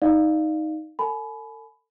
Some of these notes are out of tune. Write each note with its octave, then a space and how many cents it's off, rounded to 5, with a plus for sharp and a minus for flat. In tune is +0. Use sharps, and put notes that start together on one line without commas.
D#4 +5 D5 +40 F5 +0
A4 +40 G#5 +40 B5 +10